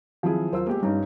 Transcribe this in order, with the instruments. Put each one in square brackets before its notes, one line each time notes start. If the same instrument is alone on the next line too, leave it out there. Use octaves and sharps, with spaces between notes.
[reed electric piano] D#3 F#3 C4 [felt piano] F3 E4 G#4
[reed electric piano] D#2 F#3 E6 [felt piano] F4 A#4 C5
[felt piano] G#3 G4 [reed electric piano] A#3 B3
[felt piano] G2 C#4 D#4 [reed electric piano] G3